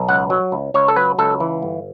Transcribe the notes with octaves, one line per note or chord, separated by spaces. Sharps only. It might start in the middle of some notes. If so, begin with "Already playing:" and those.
Already playing: B1
C#2 F#5
F#3
C#2
C#2 C#5
A4
F#3 B4
C#2 A4
E3
G1